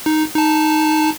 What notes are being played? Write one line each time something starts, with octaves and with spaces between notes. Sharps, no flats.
D#4
D#4 A5